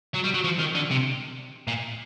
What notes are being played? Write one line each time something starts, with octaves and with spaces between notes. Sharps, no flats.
F#3
G3
F#3
F3
D#3
D3
C3
A#2